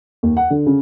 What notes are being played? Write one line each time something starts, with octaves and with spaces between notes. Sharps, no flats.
D#2
F#5
D3
C#3